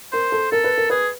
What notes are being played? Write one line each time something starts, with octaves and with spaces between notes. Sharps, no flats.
A#4 C5
A4
A4 A#4
B4
A#4
G#4 B4